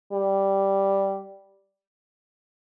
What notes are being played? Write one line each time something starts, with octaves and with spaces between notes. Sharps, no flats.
G3